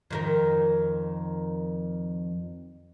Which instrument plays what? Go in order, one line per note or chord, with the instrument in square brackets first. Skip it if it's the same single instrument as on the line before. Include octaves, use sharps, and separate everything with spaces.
[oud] F2 D#3 A#4